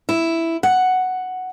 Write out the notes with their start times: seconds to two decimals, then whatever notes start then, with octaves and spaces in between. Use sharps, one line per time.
0.09 E4
0.63 F#5